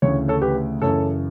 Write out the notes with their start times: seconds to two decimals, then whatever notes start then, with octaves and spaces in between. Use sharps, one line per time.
0.02 D2 C#3 E3 C#5
0.28 A4 C#5
0.42 G4 B4
0.82 F#2 C#3 E3 A4 C#5